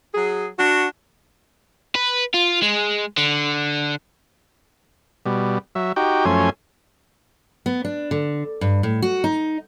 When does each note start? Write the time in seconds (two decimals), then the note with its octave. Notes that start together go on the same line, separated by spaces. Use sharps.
0.15 F#3 G#4
0.59 D4 F#4
1.95 B4
2.34 F4
2.63 G#3
3.18 D3
5.26 B2 G3
5.75 F#3 E5
5.96 D#4 F#4 G4 G5
6.25 F#2 F3 A3 C#4 G#5 C6
7.66 B3
7.85 D4
8.11 D3
8.61 G2
8.83 A2
9.02 F#4
9.24 D#4